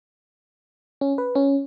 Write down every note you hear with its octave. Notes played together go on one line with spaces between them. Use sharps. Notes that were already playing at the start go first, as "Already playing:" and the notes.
C#4
B4
C#4